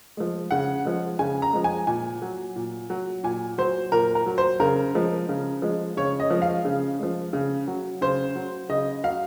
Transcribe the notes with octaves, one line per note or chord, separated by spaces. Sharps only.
F3 G#3
C#3 F#5
F3 G#3
C#3 G#5
A#5
F3 G#3
G#5
A#2 G#5
F#3
A#2
F#3
A#2 G#5
F#3 C5
A#2 A#4
A#4
F#3
C5
C#3 A#4
F3 G#3
C#3
F3 G#3
C#3 C#5
D#5
F3 G#3
F5
C#3
F3 G#3
C#3
F#3
C#3 C5
F#3
C#3 D#5
F#3 F5